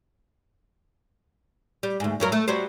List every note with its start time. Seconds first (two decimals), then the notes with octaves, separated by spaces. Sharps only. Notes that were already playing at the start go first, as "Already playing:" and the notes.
1.83 G3
2.00 D2 G#2
2.20 G2 F#3 A#4
2.32 A3
2.48 F#3 G3 C5